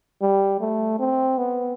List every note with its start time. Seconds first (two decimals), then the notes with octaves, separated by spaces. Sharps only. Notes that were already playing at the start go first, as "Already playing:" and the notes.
0.22 G3
0.60 A3
0.99 C4
1.38 B3